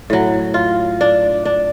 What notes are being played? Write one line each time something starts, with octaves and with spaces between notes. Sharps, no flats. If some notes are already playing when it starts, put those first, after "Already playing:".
A2 F#3
F4
D4
D4